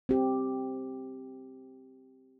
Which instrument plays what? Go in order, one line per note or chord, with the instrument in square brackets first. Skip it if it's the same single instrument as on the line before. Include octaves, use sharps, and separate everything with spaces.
[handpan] C4 G4